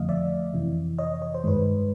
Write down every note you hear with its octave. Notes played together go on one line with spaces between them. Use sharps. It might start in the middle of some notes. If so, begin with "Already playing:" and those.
Already playing: F2 D3 F3 A3 D#5 F5
D5 E5
F2 C3 E3
C#5 D#5
C#5
C5
G2 D#3 G#3 B4 C#5